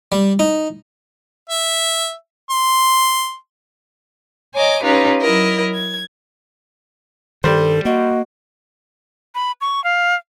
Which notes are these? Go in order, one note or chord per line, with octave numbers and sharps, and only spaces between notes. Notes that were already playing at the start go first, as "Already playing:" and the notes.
G3
D#4
E5
C6
C#5 D#5 G#5 A#5 D6
C#4 D#4 F4 G4 B4
F#3 E4 A#4 D#5
G#6
G2 D#3 G3 A4 C5
A#3 F#4 D#5
B5
C#6
F5